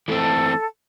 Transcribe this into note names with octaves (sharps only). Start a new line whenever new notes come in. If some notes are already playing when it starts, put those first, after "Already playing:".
E3 A3 C4 A4